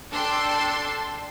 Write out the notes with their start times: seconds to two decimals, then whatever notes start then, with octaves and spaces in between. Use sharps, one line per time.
0.13 D4 A4 G5 C6